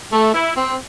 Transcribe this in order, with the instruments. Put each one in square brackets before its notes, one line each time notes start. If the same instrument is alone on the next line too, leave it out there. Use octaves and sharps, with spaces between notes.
[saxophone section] A3
E4
C4